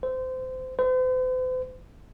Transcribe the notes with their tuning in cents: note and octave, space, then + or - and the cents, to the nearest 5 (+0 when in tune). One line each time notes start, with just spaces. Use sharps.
C5 -25
C5 -45